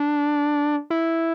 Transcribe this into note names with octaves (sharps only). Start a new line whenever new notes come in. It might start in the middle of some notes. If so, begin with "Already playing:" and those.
Already playing: D4
E4